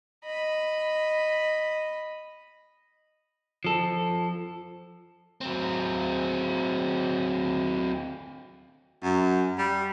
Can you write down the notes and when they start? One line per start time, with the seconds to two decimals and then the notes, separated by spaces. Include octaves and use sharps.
0.25 D#5 B5
3.64 F3 A4
5.41 F#3 C4
9.03 F#2
9.58 G3